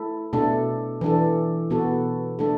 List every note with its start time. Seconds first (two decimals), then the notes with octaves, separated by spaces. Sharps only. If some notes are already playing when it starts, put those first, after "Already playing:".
Already playing: A3 E4 A4
0.33 B2 A3 D4 A4
1.01 E3 D4 A4
1.70 B2 B3 F#4 A4
2.39 A3 D4 A4